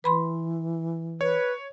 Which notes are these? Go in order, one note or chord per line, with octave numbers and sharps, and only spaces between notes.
E3 B4 B5 C6
B4 C#5